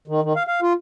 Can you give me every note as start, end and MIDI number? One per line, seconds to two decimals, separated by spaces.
0.08 0.21 51
0.23 0.33 51
0.36 0.43 77
0.47 0.60 77
0.62 0.73 65